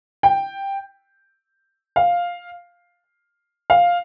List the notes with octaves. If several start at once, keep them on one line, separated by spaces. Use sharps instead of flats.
G5
F5
F5